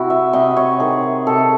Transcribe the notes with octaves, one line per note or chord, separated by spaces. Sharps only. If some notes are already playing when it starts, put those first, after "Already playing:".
Already playing: C3 E4 F#4
E5
C3 D#5
C#5
D#3 G#4
C3 A4